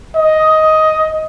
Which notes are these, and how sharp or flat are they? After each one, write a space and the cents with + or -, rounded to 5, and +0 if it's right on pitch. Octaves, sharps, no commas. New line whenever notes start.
D#5 +10